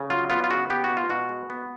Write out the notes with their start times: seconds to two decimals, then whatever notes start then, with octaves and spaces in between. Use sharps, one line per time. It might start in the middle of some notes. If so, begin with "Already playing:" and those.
Already playing: C#3
0.10 F#3 F4
0.30 B3 F4
0.44 F4
0.50 C#3 F#4
0.70 B3 G4
0.84 F#4
0.90 B2
0.97 F4
1.09 B2 F#4
1.29 G#3
1.50 B3